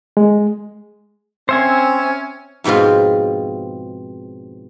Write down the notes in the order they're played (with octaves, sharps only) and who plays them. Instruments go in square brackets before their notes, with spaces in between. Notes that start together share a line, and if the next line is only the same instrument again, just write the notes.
[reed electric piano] G#3
[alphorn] C4 [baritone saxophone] C#4 [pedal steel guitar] C5 E5 G#5
[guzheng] F2 G#2 B2 C4 F4